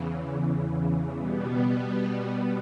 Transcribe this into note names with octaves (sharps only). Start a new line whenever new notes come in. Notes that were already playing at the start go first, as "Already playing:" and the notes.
Already playing: E2 C#3 E3
B2 G3 B3